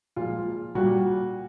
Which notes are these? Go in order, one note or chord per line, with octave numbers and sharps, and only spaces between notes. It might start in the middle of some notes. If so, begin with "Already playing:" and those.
A#2 F3 G#3 F4
A#2 G3 F#4